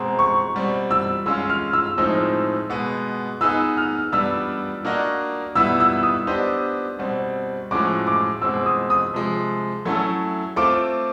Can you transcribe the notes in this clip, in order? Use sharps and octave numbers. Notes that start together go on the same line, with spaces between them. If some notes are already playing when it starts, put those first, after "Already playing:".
Already playing: B2 G#3 C4 A#5
C#6
B2 G3 C4
E6
G#3 C#4 F4 E6
F6
E6
A2 F3 G#3 C4 D#4 E6
B2 G#3 B3
B3 D#4 G#4 B4 E6
F6
G3 B3 D4 E6
A#3 D4 F#4 A#4 D#5
B2 G3 B3 E4 E6
E6
D#6
B3 D4 G4 C5 D#5
B2 G3 C4
A2 F3 G#3 C#4 F#4 D6
D6
B2 G#3 C4 E6
D#6
D#6
C3 F3 G#3
F#3 A3 C#4 E4 A4
A3 C4 F4 A4 D6